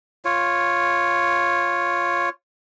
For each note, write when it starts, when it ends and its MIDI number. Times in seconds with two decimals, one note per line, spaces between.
0.25 2.29 65
0.25 2.29 73